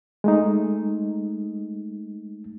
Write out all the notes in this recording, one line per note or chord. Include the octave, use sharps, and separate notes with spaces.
G#3 A3 D#4